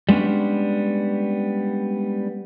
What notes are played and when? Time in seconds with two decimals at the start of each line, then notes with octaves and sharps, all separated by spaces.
0.09 G3 G#3 B3 C#4 D4